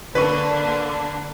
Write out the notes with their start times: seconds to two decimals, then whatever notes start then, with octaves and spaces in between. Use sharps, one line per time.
0.15 D3 A#3 D4 B4 C#6